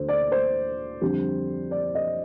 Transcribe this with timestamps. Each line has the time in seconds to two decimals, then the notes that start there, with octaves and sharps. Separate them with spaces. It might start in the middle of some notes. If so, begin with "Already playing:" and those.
Already playing: D2 D3 A3 C5
0.09 D5
0.32 C5
1.01 F2 D3 G3
1.71 D5
1.95 D#5